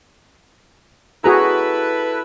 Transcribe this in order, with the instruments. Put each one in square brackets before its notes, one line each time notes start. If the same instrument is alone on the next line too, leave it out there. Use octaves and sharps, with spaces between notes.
[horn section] E4 A4 B4 [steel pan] F#4 G#4 A#5